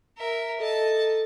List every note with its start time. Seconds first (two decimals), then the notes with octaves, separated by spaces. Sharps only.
0.17 A#4 E5
0.60 A4 D#5 A5